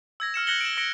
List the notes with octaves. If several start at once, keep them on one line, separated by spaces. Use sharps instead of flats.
E6 G#6 A#6
E6 F6 C#7 E7
F#6 G#6 A#6 C#7 F#7 G7
D7 E7
E6 A#6 C#7 D7